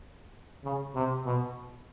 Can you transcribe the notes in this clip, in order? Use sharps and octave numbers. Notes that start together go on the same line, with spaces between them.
C#3
C3
B2